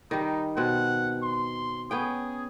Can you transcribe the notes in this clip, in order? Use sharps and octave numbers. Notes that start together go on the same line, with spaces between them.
D#3 G3 D#4
B2 C4 F#5
C6
B3 C#4 G#4 G5